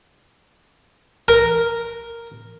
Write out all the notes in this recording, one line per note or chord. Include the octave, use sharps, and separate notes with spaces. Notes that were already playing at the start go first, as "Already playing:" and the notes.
A#4